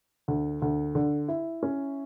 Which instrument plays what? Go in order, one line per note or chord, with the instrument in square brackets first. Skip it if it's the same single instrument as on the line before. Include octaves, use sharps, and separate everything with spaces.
[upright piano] D2
D2
D3
E4
C#4